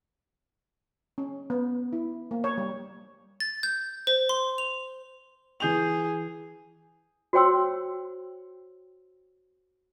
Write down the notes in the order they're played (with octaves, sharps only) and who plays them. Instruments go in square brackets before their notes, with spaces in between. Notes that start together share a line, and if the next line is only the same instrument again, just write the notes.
[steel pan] C#4
B3
E4
A#3
C#5
G3
[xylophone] A6
G6
C5
C6
F7
[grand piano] E3 G6 F7 [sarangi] G#4
[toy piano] F#4 C5 C#5 G5 C6 E6